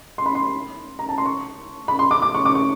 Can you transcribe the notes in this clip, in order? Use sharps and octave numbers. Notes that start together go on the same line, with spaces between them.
C6
B5
C6
A#5
A5
C6
C#6
B5
C6
D6
D6
C#6
D6
C#6